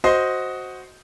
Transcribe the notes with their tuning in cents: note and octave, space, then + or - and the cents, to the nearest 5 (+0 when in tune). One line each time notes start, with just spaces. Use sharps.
F#4 +0 C5 +0 D#5 +10